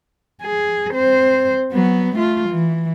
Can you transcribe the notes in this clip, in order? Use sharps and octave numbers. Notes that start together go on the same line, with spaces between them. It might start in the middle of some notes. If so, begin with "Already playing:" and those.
G#4
C4 C5
F#3 B3
A3 F4
E3